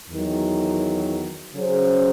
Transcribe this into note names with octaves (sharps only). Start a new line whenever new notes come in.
E2 D#3 F#3
C#3 F#3 C#4 G#4 C5